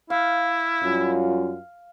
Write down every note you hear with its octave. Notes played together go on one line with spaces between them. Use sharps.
E4 F5
F#2 G3 F4